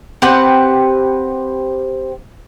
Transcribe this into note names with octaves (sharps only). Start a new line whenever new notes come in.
C4 G4 B4 F#5